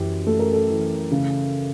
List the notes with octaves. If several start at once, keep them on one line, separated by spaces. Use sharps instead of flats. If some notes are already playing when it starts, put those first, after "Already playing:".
Already playing: F#2 E3 G4
A3 A4
A#4
A4
E3
C#3